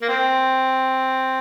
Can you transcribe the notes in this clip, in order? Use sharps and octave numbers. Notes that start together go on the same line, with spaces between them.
A#3
C4